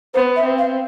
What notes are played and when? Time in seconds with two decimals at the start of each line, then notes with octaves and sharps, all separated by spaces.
0.14 B3 C5
0.36 E5
0.44 C4
0.58 F5